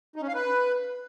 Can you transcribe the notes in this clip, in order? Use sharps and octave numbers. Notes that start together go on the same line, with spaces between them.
D#4
C#4
F5
B4